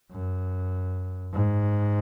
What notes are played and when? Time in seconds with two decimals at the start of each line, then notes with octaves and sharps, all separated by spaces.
0.12 F#2
1.33 G#2